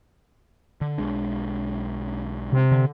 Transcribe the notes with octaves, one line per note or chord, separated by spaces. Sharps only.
D3
B1 G#3 D4
C3
D3